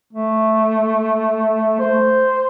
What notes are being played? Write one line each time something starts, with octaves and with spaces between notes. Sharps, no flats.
A3
C5